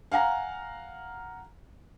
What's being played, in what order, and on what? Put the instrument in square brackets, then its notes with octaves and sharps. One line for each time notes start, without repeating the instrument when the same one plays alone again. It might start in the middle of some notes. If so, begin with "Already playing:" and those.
[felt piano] F5 F#5 G#5 A#5